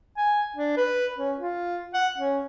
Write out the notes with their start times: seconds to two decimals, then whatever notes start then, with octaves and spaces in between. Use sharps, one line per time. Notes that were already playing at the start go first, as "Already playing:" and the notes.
0.17 G#5
0.56 D4
0.77 B4
1.18 C#4
1.38 F4
1.94 F#5
2.18 C#4